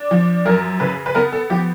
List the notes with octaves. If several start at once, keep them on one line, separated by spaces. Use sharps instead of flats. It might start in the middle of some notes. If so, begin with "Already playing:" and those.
Already playing: D4
F3
F#2 A#4
C#3 B4
B4
B3 A#4
A4
F3 G4